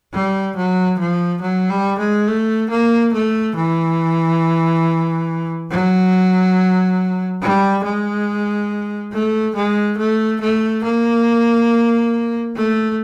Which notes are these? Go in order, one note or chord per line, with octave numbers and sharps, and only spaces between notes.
G3
F#3
F3
F#3
G3
G#3
A3
A#3
A3
E3
F#3
G3
G#3
A3
G#3
A3
A3
A#3
A3